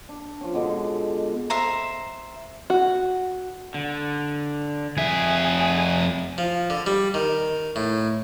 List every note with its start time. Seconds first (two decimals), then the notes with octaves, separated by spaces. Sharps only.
0.09 D4
0.41 F3 C#4
0.54 B2 D3 G#3
1.50 C5 E5 A#5
2.70 F#4
3.74 D3
4.97 F2 G#4 E5
6.38 F3
6.70 D3
6.86 G3
7.14 D#3
7.76 A2